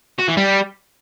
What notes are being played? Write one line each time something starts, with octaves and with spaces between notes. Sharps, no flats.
F#4
E3
G3